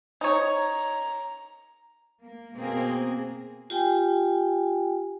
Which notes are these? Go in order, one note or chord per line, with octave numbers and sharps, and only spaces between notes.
D#4 C#5 A#5
A#3
B2 A#3 C4 G#4
F4 G4 G5 G#5